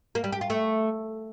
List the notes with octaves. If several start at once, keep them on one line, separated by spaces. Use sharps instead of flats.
A#3
G3
G4
F4
A3